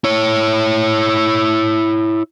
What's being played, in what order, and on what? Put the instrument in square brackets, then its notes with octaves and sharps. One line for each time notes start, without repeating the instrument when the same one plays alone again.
[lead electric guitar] E4 C#5